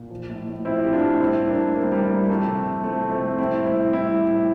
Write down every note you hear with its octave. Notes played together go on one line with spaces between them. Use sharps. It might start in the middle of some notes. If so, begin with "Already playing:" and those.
Already playing: A#2
F3
A2
A2
F3 C4 E4
F3 G4
D4 F4
A2
G3 C4 E4
A2
A#3 D4
A2
G3 A#3
C4
G3 A#3
G3 A#3
A2
A#3
F3 A3 C4
C3
C3
F3 A3 C4
F3
A3 C4
C3
G3 C4 E4
A2
C4 E4
A2
G3 C4 E4
G3
A2